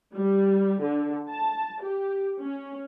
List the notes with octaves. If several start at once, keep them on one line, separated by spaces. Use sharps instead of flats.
G3
D3
A5
G4
C#4